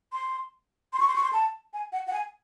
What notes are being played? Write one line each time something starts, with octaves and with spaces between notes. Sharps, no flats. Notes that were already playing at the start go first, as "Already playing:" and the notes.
C6
C6
C#6
C6
C#6
C6
A5
G#5
F#5
F#5
G#5